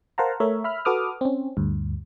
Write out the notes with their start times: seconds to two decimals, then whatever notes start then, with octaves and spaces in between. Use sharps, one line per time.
0.18 A#4 C5 F5 F#5 A5 A#5
0.40 A3 A#4 C#5 E5
0.64 E5 B5 F6
0.85 F#4 A4 B4 D6 D#6 F6
1.21 C4 C#4
1.57 D2 G2